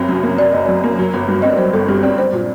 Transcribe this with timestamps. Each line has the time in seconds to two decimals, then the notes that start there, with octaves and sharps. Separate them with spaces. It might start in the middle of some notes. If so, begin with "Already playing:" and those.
Already playing: F#1 C3 F#3
0.09 F#2
0.23 A#3
0.38 F#3 D5
0.52 F#1 D#5
0.66 F#2 D5
0.84 A#3
0.99 F#3
1.13 G1
1.28 G2
1.42 C4 D#5
1.50 D5
1.58 F#3 C5
1.73 G1 A4
1.88 G2 G4
2.03 C4 D5
2.18 D4 C5
2.33 A#2